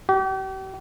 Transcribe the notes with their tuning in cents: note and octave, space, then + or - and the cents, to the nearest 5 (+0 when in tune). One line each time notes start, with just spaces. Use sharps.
G4 -40